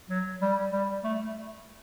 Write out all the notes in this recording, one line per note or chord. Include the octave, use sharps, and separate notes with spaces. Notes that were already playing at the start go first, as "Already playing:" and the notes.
F#3
G3
G3
A3